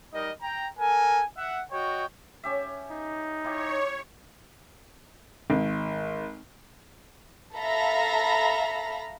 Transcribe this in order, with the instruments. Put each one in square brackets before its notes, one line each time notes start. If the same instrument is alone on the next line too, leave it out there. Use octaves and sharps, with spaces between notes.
[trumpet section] G3 D#4 A#4 D#5
G5 A#5
A4 A#4 G#5
E5 F#5
F#4 C#5 D#5 G5
[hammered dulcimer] C#4 G4 E5
[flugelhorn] D#4
[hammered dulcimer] E4 G4 [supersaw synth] C#5
[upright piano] G#1
[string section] A4 E5 F5 A#5 B5 A#6